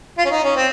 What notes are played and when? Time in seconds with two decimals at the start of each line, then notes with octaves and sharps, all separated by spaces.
0.18 F4
0.25 C#4
0.30 D#4
0.43 C#4
0.56 C4